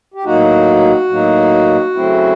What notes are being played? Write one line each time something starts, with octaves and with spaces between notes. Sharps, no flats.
G4
A2 F#3 A#3 D#4 F#4
A2 F#3 A#3 D#4
C#3 F#3 A3 C4 E4